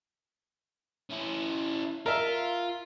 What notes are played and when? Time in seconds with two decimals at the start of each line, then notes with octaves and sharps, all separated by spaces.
1.10 C#4 E4
2.06 F4 A#4 E5